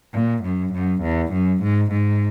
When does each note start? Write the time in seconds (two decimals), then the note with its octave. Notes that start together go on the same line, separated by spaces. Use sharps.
0.14 A#2
0.44 F#2
0.74 F#2
1.02 E2
1.33 F#2
1.63 G#2
1.92 G#2